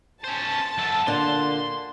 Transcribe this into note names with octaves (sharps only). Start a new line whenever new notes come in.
C#4 C5 A5
F#2 A4
A#2 D3 C6